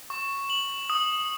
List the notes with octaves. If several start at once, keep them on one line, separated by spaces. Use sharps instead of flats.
C#6
F#7
D#6